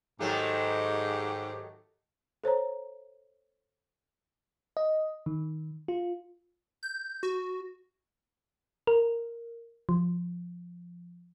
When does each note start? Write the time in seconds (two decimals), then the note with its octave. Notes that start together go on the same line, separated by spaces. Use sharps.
0.21 G#2 D#3 F#3 A3 G4
2.44 A4 C5 C#5 A#5
4.77 D#5
5.26 D#3
5.88 F4
6.83 G6
7.23 F#4
8.87 A#4
9.89 F3